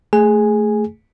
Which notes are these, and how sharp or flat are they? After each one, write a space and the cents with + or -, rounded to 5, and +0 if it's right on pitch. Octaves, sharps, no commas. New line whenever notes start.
A3 +0 G#4 +5 G#5 -5